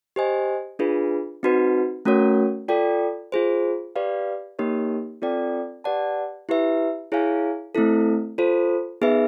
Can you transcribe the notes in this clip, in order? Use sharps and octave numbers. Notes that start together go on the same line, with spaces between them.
G4 C5 D#5 G#5
D4 F4 G#4 B4
C4 D#4 F#4 B4
A3 C#4 F#4 A#4 C#5
F4 A4 D5 G5
F4 G#4 C5
G4 B4 D5 F5
A#3 D#4 G4 A#4 C#5
C4 F4 A4 D5 G5
G4 B4 D5 F#5 A5
E4 G4 B4 E5
E4 G#4 C#5 F5 G#5
A3 C4 E4 A4
F4 A4 C5
B3 D#4 G#4 B4 E5